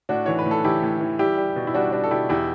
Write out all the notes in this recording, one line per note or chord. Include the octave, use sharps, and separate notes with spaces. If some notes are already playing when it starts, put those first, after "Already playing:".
A2 D4 F#4
E3 C#5
B4
A2
A4
E3 E4 G4
A2
E3
G3 E4 G4
G3
B2
E4
G3 D4 F#4
G3 D4 F#4
A4
B2 E4 G4
E2 E4 G4